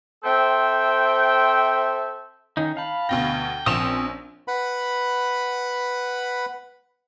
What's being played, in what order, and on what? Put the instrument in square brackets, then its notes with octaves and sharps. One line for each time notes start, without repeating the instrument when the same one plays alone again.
[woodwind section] C4 A4 C5 E5 G5
[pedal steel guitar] D#3 C#4 D#4
[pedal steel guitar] F5 B5 [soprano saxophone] A5
[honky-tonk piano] D2 B2 A#6 [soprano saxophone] G5
[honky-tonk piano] A#1 E7 F7 [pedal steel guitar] C4 C#4 D#6
[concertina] B4 F#5 B5